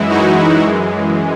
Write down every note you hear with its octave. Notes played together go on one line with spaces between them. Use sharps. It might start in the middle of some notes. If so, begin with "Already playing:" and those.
Already playing: F#2 E3 G#3 E4
D#4 F#4
F#2 E3 G#3